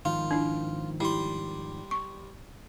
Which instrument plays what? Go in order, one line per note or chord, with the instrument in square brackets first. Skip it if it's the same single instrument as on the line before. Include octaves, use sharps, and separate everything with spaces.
[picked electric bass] G#1 D#3 F3 [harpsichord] F4
[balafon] D4 E4
[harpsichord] G3 C6 [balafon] E4
[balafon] C#6